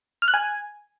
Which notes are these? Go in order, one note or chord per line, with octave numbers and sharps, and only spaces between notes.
F6
F#6
G#5